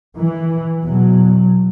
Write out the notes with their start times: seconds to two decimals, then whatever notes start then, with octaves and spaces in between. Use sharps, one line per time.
0.17 E3
0.84 E2 B2 F#3